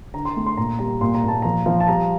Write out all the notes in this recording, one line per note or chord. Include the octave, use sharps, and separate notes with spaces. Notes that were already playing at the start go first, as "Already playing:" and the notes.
D3 A#5
C6
A3
C6
A#2 A#5
G3 A#5
A#2 C6
A#5
A#2 A5
F3 A#5
F3
A5
G3 A#5